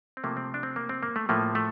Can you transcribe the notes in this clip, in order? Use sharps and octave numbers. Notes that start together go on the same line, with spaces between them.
C4
C3 F3 A3 A#3
C4
D4
C4
A#3
C4
A#3
A3
A2 F3 A3 A#3
A3